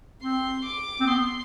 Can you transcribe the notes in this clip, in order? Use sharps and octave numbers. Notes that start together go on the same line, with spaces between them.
C4 C6
D6
C4
B3 C6